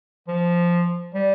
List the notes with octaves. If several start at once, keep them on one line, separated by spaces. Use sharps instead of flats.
F3
G3